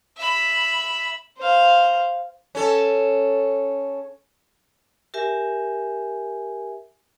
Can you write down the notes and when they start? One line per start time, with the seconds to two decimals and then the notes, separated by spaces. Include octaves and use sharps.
0.17 E5 B5
1.38 C5 F5
2.55 C#4 A4
5.14 G4 A#4 E5 G#5